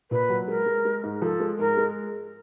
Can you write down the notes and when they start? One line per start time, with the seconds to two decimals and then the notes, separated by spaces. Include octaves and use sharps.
0.11 A#2 B4
0.30 F#3
0.48 G#3 A#4
0.66 G#3
0.85 G#3
1.04 G#2
1.22 F3 A4
1.40 G#3
1.59 G#2 A#4
1.77 G#3